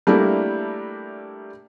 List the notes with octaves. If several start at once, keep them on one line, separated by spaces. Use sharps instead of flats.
G3 A3 A#3 D4 E4 A#4